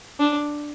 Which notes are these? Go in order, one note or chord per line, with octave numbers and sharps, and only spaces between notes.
D4